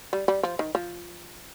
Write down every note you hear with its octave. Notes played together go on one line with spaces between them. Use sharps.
G3
G3
F3
D#3
F3